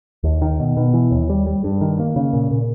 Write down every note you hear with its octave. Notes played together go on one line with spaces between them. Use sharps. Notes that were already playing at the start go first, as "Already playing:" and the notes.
D#2
D#3
B2
B2
E3
D#2
G3
G3
G2
D#3
A#3
C#3
A#2
A#2